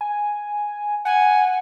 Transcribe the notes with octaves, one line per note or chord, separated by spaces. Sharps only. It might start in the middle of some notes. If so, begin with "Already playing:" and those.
G#5
F#5 G#5